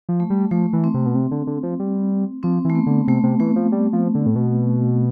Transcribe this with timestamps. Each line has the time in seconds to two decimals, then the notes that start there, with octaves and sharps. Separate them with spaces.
0.09 F3
0.20 A3
0.30 G3
0.51 F3 A3
0.73 E3
0.84 C4
0.94 C3
1.06 B2
1.15 C3
1.31 D3
1.47 D3
1.63 F3
1.80 G3
2.43 F3 C4
2.65 E3 A3
2.75 B3
2.86 D3
3.07 C3 A3
3.24 C3
3.40 E3 A3
3.56 F3
3.72 G3
3.93 F3
4.15 D3
4.26 A2
4.36 B2